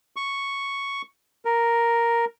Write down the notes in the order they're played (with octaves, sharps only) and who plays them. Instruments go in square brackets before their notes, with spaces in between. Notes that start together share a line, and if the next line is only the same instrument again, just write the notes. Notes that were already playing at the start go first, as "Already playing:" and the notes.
[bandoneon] C#6
A#4